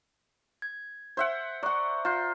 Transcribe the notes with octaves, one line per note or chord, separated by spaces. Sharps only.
G#6
C5 E5 F#5
D5 F#5 A#5 C#6 F#6
F4 A#5 G6 C7